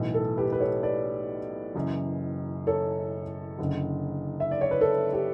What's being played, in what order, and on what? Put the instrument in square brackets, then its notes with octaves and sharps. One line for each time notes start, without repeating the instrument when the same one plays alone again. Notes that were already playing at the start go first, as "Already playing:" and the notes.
Already playing: [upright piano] B1 A2 E3
A4
G4 B4
B4
A4 C#5
B4 D5
F#1 F#2 E3
A4 C#5
F#1 F#2 D3
E5
D5
C#5
B4
A4
G4